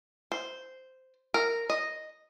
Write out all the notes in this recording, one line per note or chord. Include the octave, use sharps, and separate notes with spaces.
C5
A#4
D#5